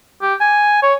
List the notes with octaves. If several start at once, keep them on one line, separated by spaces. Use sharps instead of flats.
G4
G#5
C#5